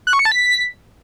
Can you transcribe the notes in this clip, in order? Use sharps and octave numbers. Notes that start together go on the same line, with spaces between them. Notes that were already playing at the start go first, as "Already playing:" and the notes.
F#6
C#6
C#7
A5
B6